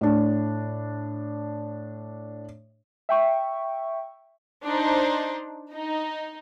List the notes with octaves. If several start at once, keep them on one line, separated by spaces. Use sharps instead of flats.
A2 D4
E5 G5 C#6
D4 D#4 C5
D#4